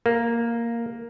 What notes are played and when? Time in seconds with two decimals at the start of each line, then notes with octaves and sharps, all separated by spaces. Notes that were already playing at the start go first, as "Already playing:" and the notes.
0.06 A#3